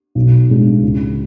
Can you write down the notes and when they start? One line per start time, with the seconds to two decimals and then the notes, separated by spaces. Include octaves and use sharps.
0.15 B1
0.50 A2 G#3 D4
0.83 C#2